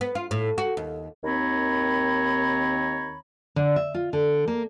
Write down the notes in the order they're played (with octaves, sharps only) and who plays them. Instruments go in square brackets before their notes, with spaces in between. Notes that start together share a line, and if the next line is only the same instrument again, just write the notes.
[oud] B3
F4
A2
F#4
D#2
[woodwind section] D#2 D#3 C4 C#5 A#5 B5
[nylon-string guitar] D3
E5
F4
D3
A#3